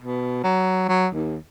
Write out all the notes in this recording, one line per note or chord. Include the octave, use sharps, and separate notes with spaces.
B2
F#3
F#3
D#2